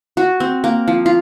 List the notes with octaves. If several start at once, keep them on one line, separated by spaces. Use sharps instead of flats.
F#4
C4
A#3
F3
F4